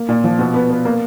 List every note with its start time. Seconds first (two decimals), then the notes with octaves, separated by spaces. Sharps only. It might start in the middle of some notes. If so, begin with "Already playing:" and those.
Already playing: A#3
0.09 A#2
0.24 F3
0.39 B2
0.54 B3
0.70 B3
0.85 A#3